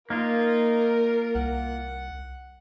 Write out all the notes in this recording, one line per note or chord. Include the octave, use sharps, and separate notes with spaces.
A#3 D#4 F4 A#4
C2 F#5